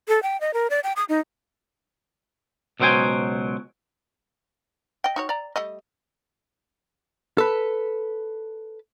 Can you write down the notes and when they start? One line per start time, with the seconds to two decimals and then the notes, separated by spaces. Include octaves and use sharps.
0.08 A4
0.23 G5
0.41 D#5
0.54 A#4
0.70 D5
0.84 G5
0.96 D#6
1.09 D#4
2.80 C#2 B2 F#3 C5 G5 G#5
5.04 D#5 G5
5.16 D#4 F#4 C#5
5.29 D5 A#5
5.56 G3 A3 D#5
7.38 A4 B4